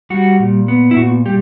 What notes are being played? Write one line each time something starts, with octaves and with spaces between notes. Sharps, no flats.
G3 F#4
A#2
B3
E4
A#2 F#4
G3 G4